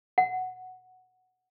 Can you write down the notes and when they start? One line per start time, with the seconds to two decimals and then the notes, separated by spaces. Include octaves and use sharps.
0.18 F#5